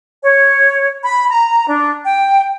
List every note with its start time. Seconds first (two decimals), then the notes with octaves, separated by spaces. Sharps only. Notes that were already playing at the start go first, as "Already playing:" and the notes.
0.23 C#5
1.05 B5
1.29 A#5
1.68 D4
2.05 G5